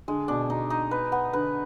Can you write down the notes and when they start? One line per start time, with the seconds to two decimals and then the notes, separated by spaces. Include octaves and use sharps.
0.08 D3 G#3
0.28 B2 D4
0.49 B2 D#4
0.70 D#4
0.91 B4
1.12 B3
1.33 D3 B4